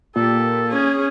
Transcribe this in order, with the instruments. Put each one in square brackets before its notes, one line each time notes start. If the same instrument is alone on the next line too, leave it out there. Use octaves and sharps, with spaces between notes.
[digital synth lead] A#2 [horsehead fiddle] G4 [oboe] A4
[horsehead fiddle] C#4 G#4